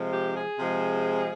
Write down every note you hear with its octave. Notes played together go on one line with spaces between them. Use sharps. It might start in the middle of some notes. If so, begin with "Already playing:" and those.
Already playing: C3 F3 G#3
G4
G#4
C3 F3 G#3